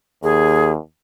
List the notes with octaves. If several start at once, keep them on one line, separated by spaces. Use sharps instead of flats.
D#2 G#4